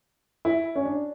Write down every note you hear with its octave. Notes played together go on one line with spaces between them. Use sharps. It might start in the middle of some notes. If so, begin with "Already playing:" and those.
E4
C#4
D4